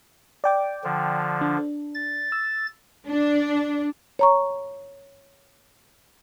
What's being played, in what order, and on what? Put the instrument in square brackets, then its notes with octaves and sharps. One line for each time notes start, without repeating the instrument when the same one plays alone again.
[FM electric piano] D5 G5 D6
[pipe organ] D3 F3
[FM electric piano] D4
[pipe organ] A6
[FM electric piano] E6
[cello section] D4
[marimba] C#5 A#5 C#6